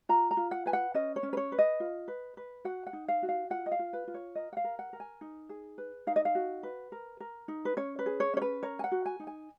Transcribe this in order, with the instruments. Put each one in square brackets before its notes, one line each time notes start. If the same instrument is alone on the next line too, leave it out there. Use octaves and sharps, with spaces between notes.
[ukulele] F4 A#5
A#5
F4
F#5
B4 G#5
F#5
C#4 D#5
C#5
C#4
B4
C#5
B4
D#5
F4
B4
B4
F#4 F#5
F#5
D#4
F5
F#4
F5
F4 F#5
D#5
F5
F4
B4
F4
C#5
A#4 D#5
F#5
F5
A#4
F#5
A#4
G#5
D#4
G#4
B4
D#4 F5
D#5
F5
F#4
B4
A#4
A#4
D#4
B4
C#4 C#5
B4
G#4
C#5
C#4 C#5
B4
A#4 C#5
G#5
F#5
F#4
G#5
D#4
G#5